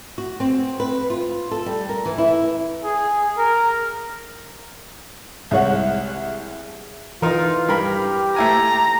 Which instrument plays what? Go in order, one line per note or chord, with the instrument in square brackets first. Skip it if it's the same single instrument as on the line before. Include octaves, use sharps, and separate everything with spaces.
[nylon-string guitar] F#4
C4
B4
F4
A4
G3
A#4
E3
E4
[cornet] G#4
A#4
[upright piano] C2 G#3 C#5 F#5
[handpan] E3 [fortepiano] D#4 A#4 [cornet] F4
[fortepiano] G2 A#4 B5 [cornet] G4
[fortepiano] A3 E4 G#5 [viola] A#5